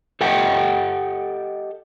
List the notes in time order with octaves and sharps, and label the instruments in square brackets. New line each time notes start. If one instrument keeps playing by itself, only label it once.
[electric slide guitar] G4 A4 D#5 F#5 G5